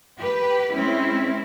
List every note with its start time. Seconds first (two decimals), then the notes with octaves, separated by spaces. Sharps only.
0.18 G4 B4
0.73 G#3 C4 C#4 E4